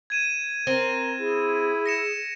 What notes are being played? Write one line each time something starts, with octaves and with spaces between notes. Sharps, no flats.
G#6 D#7 E7
C4 A#4
E4 G#4
A#6 C#7 E7